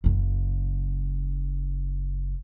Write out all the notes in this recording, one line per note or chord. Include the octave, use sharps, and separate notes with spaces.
F#1 C#3